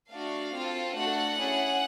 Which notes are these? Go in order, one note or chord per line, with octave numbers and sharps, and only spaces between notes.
A3 D4 F#4 F5
C4 F4 A4
A3 D4 F#4 A4 F#5
C#4 E4 G#4